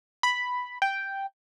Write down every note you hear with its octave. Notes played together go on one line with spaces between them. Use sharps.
B5
G5